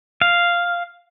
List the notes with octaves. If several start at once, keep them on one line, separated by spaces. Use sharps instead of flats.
F5